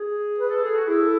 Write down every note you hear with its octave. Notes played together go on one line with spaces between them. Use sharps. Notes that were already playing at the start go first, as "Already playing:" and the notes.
Already playing: G#4
B4
A4
G#4 A4
F#4
E4 G#4
A4